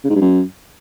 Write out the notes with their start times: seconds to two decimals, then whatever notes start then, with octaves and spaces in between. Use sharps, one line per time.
0.04 C#3
0.10 G#2
0.15 G2
0.21 F#2